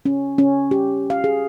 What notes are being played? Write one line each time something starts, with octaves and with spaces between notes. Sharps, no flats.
C#4
C#4
G4
F5
G#4